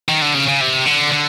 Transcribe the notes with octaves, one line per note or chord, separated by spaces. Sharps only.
D#3
D3
C#3
C#3
C3
D3
D3